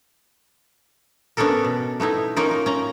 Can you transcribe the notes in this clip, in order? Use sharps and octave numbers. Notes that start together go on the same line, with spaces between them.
B3 C#4 D4 A4 A#4
B2
A3 B3 D#4 E4
A#3 C#4 D#4 F4 A#4
D#4
C#4 A#5